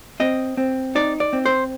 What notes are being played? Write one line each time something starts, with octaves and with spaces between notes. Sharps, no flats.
C4 D#5
C4
D#4 D5
D5
C4
C5